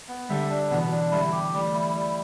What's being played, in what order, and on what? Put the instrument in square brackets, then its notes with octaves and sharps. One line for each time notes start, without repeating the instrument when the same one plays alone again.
[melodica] B3
[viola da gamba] D3 G3 [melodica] E5
[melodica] D4
[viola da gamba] B2 E3 [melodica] B3
[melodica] D4
[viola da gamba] D3 G3 [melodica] E4
[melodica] G4
[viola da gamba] E3 A3 [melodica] G3
[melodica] E4
G3